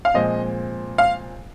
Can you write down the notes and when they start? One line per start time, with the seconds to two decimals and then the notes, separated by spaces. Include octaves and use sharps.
0.05 F5
0.14 A#2 F3 G#3 C4 D#5
0.98 F5